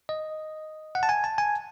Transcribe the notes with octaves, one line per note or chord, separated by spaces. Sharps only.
D#5
F#5
A5
G#5
A5
G#5